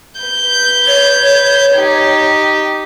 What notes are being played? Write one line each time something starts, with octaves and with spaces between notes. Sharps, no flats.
B4 G6
C#5
D#4 G4